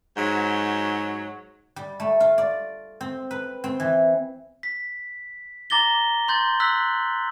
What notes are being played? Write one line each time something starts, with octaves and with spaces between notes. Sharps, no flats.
G#2 F#3 F#4
G3
A3
F4
D5
C4
B4
C4
E3
B6
A#5 D6 A6 A#6 G7
C6 G6 A6
E6 F#6 B6 F#7